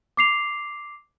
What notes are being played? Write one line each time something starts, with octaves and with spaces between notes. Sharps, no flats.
D6 C7 F7